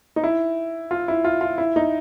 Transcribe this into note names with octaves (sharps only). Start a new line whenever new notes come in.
D#4
E4
F4
E4
F4
F4
E4
D#4